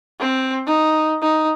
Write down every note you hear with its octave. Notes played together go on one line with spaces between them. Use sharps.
C4
D#4
D#4